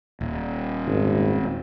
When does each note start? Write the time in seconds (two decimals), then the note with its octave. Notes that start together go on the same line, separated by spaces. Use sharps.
0.21 D#1
0.87 G#1